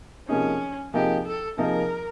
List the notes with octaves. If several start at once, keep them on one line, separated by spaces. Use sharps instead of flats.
C3 F3 A#3 C#4 D#4 G#4
C3 F3 A#3 D#4 G4 G#4
A4
C3 F3 A#3 D#4 G#4 A#4